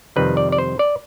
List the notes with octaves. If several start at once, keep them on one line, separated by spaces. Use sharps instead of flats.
F2 C3 D#3 G3 C4 B4
D5
D5
C5
D5